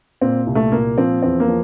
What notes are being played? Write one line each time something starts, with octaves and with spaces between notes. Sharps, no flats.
A#2 C4
C2
A3
A#2 A#3
F3 C4
E2 C4
A#3
F3